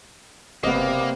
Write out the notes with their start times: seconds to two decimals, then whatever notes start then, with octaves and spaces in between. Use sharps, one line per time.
0.63 F#1 C3 A#3 B3 D5 D#5